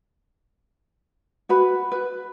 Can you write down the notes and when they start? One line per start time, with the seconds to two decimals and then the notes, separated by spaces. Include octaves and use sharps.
1.49 F#4 B4 B5
1.92 B4